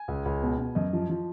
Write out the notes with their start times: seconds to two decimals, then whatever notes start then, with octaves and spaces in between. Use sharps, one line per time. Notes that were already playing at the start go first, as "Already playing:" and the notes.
Already playing: G#5
0.08 C#2
0.25 C#2
0.43 B2
0.58 B2
0.75 F#2 D#5
0.93 F3
1.09 F3